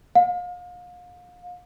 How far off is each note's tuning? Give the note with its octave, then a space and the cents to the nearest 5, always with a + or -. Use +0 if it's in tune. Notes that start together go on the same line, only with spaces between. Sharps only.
F5 +35